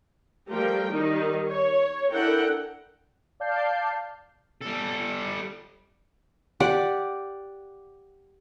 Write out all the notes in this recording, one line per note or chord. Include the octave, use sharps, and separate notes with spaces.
F3 G3 A3 A#4 G5
D#3 G3 D#4
C#5
D4 E4 A4 A#4 F#5 G5
D5 F5 A5 G6 C7
G3 A4
G4 D5 F#5